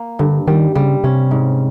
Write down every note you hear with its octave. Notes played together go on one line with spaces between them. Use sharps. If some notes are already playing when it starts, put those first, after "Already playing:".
Already playing: A#3
G2 D3
D#3 G3
C#3 G3
C3 C#4
G#2